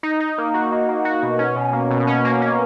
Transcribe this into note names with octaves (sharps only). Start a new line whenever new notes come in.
D#4
D#4
A#3
F#4
A#3
A#3
F#4
B2
C#4
B2
A#3
B2
C#4
A#3
C#4